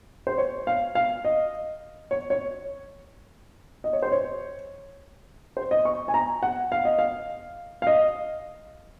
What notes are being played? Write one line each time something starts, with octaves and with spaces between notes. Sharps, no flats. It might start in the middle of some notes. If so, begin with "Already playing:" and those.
C5
C#5
F5
F5
D#5
C#5
C#5
D#5
C#5
C5
C#5
C5
D#5
C#6
G#5
A#5
F#5
F5
D#5
F5
F5
D#5